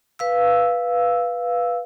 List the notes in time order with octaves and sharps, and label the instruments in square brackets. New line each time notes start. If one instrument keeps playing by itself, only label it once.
[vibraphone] B4 F5 E6